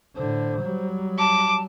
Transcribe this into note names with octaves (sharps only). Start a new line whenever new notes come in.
A2 D3 C5
F#3 G3
A5 D6